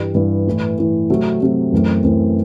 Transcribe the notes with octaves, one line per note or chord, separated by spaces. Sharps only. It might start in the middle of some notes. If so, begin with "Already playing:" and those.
Already playing: G2 E3 G3
G2 E3 G3
A2 E3 A3
A2 E3 A3
C3 F#3 A3 C4
C3 F#3 A3 C4
F#2 E3 A3 C4
F#2 E3 A3 C4